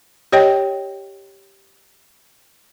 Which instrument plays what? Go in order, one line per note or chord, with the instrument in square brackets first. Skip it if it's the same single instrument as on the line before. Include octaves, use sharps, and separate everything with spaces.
[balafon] G4 C#5 D#5 G5